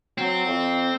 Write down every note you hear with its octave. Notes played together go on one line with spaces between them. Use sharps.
F#3 C4
F2